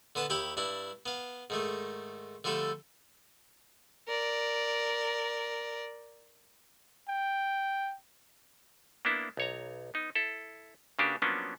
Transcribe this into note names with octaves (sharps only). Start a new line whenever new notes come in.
D3 B3 B4 A5
D#2 E4 G4 B5
G2 D4 E4
B3 F5
G#2 D#3 A3
D3 F3 G3 A3 A4
A#4 D5
G5
A#3 B3 D4 E4
B1 C#5 A#5
B3 D#4
E4 A4
C#3 A#3 D4 F#4 G4 B4
F3 F#3 A#3 B3 C#4 D4